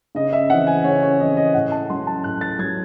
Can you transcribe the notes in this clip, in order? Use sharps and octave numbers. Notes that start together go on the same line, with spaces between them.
C#3 D#5
E5
E3 C4 F#5
G#5
C#3 C#5
C#5
E3 C4 D#5
D#5
A2 F#5
A5
F#3 C#4 C6
A5
A2 F#6
A6
F#3 C#4 G#6